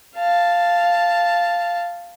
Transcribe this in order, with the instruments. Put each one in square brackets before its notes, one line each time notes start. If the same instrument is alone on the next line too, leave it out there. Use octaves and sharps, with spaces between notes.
[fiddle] F5 A5